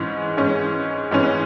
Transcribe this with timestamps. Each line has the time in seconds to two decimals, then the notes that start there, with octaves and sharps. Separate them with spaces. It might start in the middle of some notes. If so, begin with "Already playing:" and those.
Already playing: G#2 E3 C#4
0.37 G#2 E3 C#4
1.11 G#2 E3 C#4